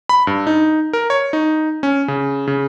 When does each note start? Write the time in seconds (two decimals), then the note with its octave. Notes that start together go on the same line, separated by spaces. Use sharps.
0.09 B5
0.27 G2
0.47 D#4
0.93 A#4
1.10 C#5
1.33 D#4
1.83 C#4
2.08 C#3
2.47 C#3